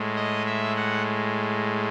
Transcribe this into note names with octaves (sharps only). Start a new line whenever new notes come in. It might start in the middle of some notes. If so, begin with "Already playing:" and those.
Already playing: A2 G#3
D#5
E5
F#5